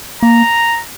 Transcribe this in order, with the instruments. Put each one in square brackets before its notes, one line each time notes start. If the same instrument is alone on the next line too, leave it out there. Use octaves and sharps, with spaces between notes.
[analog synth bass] A#3 [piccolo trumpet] A#5